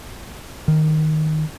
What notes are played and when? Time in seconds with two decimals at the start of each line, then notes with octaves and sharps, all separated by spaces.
0.68 D#3